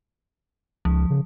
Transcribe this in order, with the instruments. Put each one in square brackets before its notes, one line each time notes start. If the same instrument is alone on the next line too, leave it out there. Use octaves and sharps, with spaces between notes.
[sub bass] C#2 [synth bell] F3
[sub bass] C#3